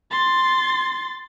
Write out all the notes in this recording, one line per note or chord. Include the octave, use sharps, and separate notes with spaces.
C6 A6